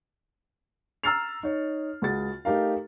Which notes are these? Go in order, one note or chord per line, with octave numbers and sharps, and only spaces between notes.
A#5 E6 F6 A6 C7 F7
D#4 C#5
C#2 F#4 G#4 F#5 A6
A3 D#4 G4 A#4 F5